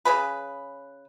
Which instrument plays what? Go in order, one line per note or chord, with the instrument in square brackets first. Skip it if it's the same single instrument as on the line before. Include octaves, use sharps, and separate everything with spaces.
[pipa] C#3 G#3 G#4 B4